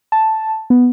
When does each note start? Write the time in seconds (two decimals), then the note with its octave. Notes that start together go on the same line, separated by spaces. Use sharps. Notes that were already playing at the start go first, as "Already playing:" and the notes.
0.12 A5
0.70 B3